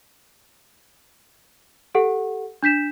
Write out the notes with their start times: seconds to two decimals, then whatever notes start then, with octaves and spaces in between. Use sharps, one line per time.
1.95 G4 A4 F#5
2.63 D4 G6 B6 E7